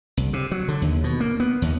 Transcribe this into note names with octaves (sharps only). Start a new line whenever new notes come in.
C2
C3
F#3
D3
D#2
B2
A#3
B3
D#2